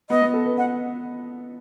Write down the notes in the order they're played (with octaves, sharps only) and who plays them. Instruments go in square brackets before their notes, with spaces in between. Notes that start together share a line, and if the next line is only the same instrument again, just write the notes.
[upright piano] B3 [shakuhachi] D#5
[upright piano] B3
A4
B4
[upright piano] D#5 [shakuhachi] F#5